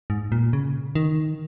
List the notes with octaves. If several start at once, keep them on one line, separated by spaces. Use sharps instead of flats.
G#2
A#2
C#3
D#3